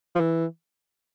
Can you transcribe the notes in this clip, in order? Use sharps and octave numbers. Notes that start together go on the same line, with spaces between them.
F3
E3